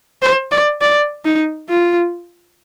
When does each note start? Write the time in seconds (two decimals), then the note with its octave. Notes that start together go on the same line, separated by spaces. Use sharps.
0.22 C5
0.51 D5
0.81 D5
1.25 D#4
1.70 F4